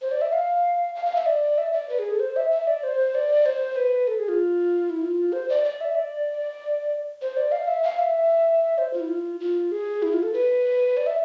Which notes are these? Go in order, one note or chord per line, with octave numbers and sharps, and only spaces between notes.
C5
D5
E5
F5
F5
F5
E5
D5
E5
D5
B4
G#4
A4
C5
E5
E5
D5
C5
D5
C5
B4
A4
G#4
F4
E4
F4
C5
D5
D5
E5
D5
C5
D5
F5
E5
F5
E5
C5
F4
E4
F4
F4
G#4
E4
F4
A4
B4
D5
E5